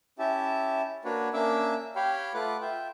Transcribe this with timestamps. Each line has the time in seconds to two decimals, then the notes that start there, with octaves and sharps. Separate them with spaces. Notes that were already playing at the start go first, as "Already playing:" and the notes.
0.19 C#4 E4 G4 E5 A5
1.05 A#3 D4 F#4 B4 C#5
1.34 A#3 C#4 D4 E5 D6 E6
1.96 G4 C#5 F5 G5 B5
2.34 A3 F4 B4 F#5 D6
2.61 F4 E5 G5